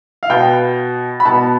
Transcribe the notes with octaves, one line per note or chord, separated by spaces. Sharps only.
F5
B2 B3 G5
B5
B2 B3 A5